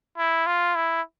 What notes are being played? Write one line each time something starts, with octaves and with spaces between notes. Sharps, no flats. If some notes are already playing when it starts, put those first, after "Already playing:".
E4
F4
E4